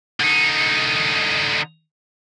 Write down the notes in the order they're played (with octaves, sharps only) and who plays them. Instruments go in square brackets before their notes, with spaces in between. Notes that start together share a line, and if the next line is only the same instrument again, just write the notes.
[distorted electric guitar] D3 D#4